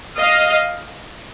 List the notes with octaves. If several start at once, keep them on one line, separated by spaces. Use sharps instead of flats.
D#5 F5